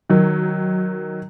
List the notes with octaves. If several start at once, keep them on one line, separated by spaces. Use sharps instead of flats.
D#3 F#3